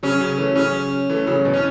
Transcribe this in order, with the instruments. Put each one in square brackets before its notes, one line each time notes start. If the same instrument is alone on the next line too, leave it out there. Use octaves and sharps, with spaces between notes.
[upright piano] C#3 F#3 [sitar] C#4
[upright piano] C#3 F#3
E3 A3
[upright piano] C#3 F#3 [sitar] C#4
[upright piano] E3 A3
C#3 F#3
B2 E3
[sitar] C#4